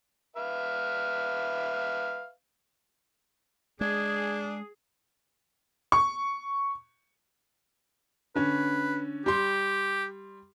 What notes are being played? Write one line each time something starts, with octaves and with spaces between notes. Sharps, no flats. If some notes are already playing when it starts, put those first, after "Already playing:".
B4 E5 F5
G#3 D4 G#4 G#6
C#6
D3 C#4 B4
G3 G4 C6